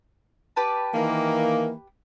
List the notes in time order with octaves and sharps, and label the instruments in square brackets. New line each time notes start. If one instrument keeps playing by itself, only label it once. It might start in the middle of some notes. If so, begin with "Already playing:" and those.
[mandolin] G4 B4 A5
[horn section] D#3 E3 A#3